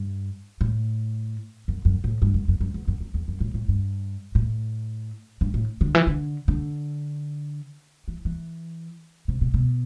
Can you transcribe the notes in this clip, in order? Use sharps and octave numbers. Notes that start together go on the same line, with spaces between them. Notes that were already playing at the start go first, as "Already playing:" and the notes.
Already playing: G2
A2
F#2
F#2
A2
G2
F#2
F#2
F#2
E2
F#2
F#2
E2
F#2
A2
A2
G2
A2
G2
A2
D3
E3
D3
D3
E3
E3
C3
B2
B2